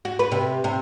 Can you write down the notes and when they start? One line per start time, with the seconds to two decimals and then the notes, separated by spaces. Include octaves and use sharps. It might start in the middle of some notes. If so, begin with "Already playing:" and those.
0.05 F#4
0.19 B4
0.32 C3
0.64 C3